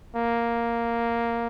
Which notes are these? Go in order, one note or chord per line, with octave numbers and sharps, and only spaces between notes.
A#3